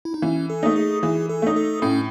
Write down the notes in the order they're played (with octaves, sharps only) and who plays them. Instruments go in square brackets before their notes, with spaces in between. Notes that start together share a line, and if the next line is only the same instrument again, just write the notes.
[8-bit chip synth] E4
D#4
[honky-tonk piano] E3 [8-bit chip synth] C#4
[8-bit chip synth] A4
[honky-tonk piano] A3 D#4
[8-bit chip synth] G#4
[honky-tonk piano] E3 [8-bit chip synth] G#4
[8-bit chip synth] A4
[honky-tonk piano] A3 D#4
[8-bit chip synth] A4
[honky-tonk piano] A2 [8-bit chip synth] C#4